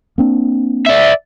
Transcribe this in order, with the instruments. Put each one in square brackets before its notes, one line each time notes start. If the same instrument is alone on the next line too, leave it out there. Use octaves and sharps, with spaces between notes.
[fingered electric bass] A#3 C4 D4
[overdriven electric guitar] D5 E5